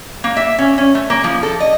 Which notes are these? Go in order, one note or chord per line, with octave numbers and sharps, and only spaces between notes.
A#3
E5
C#4
C#4
A3
A#3
F3
A4
D#5